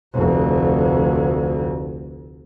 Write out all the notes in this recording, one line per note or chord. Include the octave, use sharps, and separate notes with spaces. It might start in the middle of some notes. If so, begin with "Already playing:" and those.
F1 D2